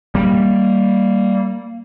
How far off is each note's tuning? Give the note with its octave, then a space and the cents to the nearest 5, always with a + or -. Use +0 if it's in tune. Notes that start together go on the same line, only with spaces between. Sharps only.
G3 +0 A#3 +0